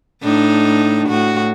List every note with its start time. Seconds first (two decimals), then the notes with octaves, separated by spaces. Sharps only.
0.22 A2 D4 D#4
1.08 A2 F#4